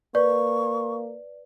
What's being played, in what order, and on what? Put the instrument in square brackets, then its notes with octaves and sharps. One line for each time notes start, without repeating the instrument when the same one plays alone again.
[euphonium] A#3 [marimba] B4 [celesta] D5 [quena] C#6